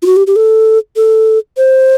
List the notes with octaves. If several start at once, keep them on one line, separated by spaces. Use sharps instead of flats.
F4
F#4
G4
G4
A4
A4
C5